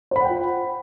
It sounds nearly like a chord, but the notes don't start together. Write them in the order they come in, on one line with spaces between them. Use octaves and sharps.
C5 B5 F#5 G5 F4